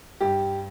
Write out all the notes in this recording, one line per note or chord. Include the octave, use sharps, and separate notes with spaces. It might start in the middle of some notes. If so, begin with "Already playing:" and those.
G2 G4